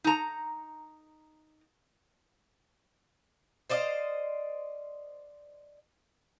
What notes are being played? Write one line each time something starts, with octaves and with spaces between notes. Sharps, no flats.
D#4 A#5
C5 D5 D#5 F5